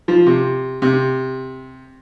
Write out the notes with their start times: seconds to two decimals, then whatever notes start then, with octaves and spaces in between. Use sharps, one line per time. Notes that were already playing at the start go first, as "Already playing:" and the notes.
0.08 F3
0.26 C3
0.82 C3